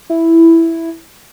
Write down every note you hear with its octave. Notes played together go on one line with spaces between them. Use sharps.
E4